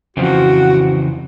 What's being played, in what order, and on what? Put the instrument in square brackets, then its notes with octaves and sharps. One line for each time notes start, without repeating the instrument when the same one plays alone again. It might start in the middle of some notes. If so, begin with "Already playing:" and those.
[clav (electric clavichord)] F2 F3 [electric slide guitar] C#3 E3 C4 [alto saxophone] F#4